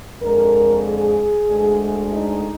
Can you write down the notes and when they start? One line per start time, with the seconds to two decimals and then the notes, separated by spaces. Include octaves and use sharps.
0.21 F2 D3 G#3 A#4
0.84 G#4
1.48 D2 D3 G#3
2.11 D#4